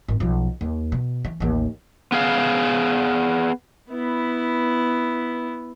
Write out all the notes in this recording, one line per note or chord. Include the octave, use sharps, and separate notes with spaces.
G#1
B1 F3
D#2
B2
E3
A1 D#2
B3 G#4 F5
B3 E4